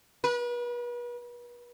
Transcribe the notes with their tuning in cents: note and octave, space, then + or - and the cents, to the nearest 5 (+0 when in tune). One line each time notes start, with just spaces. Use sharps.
B4 -40